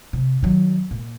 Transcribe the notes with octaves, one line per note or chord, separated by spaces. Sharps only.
C3
D#3 F#3
A#2